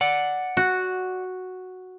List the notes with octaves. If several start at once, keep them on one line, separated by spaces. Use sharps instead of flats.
D5 F#5
F#4